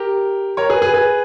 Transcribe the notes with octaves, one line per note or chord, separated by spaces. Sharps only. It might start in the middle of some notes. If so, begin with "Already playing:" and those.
Already playing: G4 A#4
A#4 C#5
G#4 B4
G#4 B4
G#4 B4